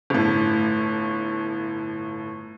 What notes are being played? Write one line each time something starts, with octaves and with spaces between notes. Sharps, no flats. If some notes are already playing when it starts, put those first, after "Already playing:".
G1 A2